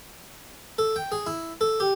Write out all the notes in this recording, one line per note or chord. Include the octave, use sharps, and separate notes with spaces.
A4
G5
G#4
E4
A4
G4